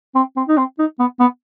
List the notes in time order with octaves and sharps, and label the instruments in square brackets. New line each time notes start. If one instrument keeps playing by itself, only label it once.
[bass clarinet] C4
C4
D#4
C4
D#4
B3
B3